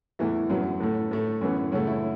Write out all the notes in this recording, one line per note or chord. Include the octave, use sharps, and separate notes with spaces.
E2 E3 A3 E4
F#2 F#3 B3
A2 A3
A2 A3
F#2 E3 B3 C#4
F#2 C#3 A3 C#4
E4